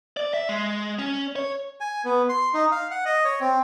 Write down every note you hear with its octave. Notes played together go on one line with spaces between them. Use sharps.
D5
E5
G#3
C#4
C#5
G#5
B3
C6
D#4
F5
F#5
D#5
C#5
C4